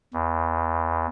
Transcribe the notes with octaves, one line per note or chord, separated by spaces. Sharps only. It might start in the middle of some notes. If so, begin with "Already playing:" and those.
E2